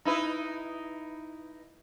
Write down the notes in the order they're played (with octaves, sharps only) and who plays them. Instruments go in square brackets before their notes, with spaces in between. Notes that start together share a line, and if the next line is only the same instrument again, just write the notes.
[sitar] D#4 E4 B4